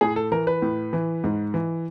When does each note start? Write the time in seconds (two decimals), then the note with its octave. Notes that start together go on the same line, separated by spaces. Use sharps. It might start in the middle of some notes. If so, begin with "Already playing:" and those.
0.01 A2 G#4
0.16 A4
0.32 E3 A#4
0.47 B4
0.62 A2
0.93 E3
1.24 G#2
1.54 E3